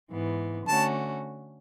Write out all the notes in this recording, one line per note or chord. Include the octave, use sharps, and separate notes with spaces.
G#2 E3 B3
D3 A3 C#4 F#4 A5